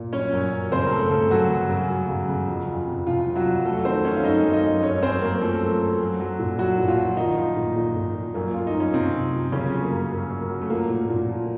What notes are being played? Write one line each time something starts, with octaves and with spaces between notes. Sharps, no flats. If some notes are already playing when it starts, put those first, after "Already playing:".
Already playing: A#2
F#3 C#4 C#5
F#2
F#2
C#3 C4 C5
A#4
F#2 A3 A4
C#3 A3 A4
F#2 F#3 F#4
C#3
F#2
F#3
C#3
C#3
F2
F2
C3
C3 F3 F4
F2
F#3 F#4
F2
F#3 A3 A4
D#3 C4 C5
D#3 C#4 C#5
F5
F#2 D#4 D#5
F#2
D#4 D#5
F#2
F#2 C#4 C#5
F#2 C4 C5
F#2 A#3 A#4
F3 A3 A4
F#2
F#2
F#3
F#3
A#2
F#3 F#4
A#2
F3 F4
F#3
D#3 F3 D#4
F3
A#2
A#2
A#2
F3
F#2 A#3
F#2 F4
D#4
F#2
C#4
C3 F3 C4
F3
F3
F#2 C#3 C#4
F#3
A#3
F#2
F#2
F#2
F#3
A3
F3 A#3
A#2
A#2
F3